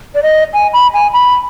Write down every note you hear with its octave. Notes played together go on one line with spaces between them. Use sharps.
D5
D#5
G#5
B5
G#5
B5